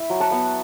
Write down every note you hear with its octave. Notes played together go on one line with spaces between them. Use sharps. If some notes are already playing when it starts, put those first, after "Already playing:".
Already playing: E4 E5
F#3
F#5 A5
B3